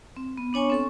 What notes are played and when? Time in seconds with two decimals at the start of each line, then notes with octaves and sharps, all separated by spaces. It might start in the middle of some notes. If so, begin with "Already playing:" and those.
0.17 C4
0.37 B3
0.53 B3 D4 C#5 G#5 C#6
0.70 C4 A4 C#6